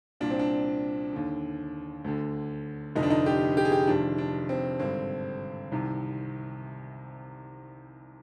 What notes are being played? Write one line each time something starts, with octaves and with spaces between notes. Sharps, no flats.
C2 A#2 D4
C4
D4
D#2 D3
D2 D3
F1 F2 D3 D#4
D4
D#4
G4
G4
G#4
G4
F1 F2 D#3 D4
D4
C4
G#1 G2 D3 C4
C2 C3 D#3